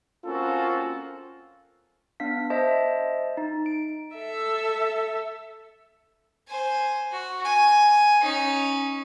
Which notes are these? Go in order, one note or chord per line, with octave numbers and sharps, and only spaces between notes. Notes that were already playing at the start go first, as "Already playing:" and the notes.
A#3 C4 C#4 F4 F#4 A4
B3 D4 F5 B6
C5 D#5 E5 A5
D#4
D7
A4 E5
C5 G#5
F#4
G#5
C#4 D#4